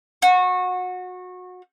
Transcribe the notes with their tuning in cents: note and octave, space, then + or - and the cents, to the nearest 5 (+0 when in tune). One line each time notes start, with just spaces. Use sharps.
F#4 -25